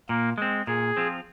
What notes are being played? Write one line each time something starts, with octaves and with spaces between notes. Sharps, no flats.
A#2 A#3
G#3 C4
A#2 G#4
F3 C4 F4